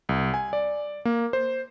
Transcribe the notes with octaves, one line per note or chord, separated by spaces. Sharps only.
C2
G#5
D5
A#3
C5